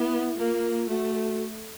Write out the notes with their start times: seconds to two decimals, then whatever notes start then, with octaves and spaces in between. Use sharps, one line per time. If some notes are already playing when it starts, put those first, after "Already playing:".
Already playing: B3 E4
0.38 A#3 F4
0.90 A3 F#4